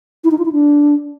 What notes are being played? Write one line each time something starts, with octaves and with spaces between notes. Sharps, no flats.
E4
D#4
F4
E4
D4